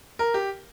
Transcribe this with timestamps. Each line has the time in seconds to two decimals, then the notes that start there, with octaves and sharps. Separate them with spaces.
0.19 A#4
0.34 G4